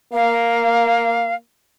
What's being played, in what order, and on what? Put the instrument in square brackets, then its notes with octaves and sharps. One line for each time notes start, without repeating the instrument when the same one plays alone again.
[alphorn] A#3 [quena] F5